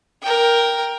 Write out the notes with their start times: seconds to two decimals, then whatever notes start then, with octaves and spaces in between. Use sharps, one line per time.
0.22 A#4 G5